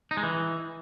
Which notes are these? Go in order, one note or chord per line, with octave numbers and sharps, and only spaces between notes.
D#4
G#3
E3